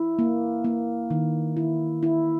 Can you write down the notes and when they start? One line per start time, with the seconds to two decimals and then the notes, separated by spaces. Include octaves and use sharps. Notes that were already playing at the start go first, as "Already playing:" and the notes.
Already playing: E4
0.19 A#3
0.64 A#3
1.10 D#3
1.57 E4
2.03 E4